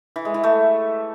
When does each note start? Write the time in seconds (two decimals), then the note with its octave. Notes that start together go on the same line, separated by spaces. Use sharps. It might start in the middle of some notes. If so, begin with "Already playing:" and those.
0.16 E3
0.25 G#3
0.34 E3
0.44 A3